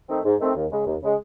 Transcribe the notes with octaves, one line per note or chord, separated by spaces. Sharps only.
D#3 A3 C4 D#4
G#2
D#3 A3 C4 D#4
D#2
C#3 G#3
D#2
C#3 G#3